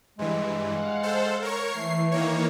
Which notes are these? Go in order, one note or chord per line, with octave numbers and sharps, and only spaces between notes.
G2 E3 G#3
F5 F#5
A4 C5
A#4 C#5 C#6 G#6
E3 A3 C7
D#3 A#3 C#5